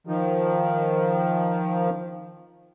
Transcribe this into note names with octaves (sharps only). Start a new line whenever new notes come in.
D#3 F3